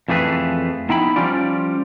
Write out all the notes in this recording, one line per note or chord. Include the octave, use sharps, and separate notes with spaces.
F2 E3 A3 G#4 B4
B3 D#4 E4 G5 B5
F3 G3 C#4 F4 D5